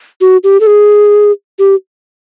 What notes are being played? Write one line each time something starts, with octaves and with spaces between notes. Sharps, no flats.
F#4
G4
A4
G#4
G4